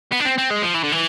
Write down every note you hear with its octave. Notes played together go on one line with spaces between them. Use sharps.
B3
D4
C4
C4
G#3
F3
E3
D3
E3